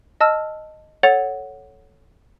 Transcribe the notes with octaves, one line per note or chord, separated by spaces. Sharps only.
D#5 A5 E6 F6
A4 C#5 F#5 A6 F7